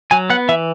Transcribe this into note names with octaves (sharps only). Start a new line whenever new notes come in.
F#3 G#5
B3 F#5
E3 E5